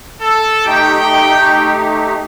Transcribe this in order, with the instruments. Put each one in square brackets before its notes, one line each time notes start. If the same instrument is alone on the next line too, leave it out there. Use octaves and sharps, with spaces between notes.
[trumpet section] A4
[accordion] A3 D#4 G4 [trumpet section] G5